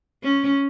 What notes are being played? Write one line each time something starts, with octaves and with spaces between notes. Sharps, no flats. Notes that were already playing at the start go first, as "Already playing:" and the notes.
C#4